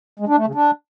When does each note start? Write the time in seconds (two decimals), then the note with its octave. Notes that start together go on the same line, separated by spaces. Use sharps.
0.19 G#3
0.28 D4
0.37 A3
0.46 C#3
0.55 D4